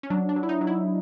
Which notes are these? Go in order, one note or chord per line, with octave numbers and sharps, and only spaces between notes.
C#4
F#3 D4
D4
F#3
E4
D#4
F#3
E4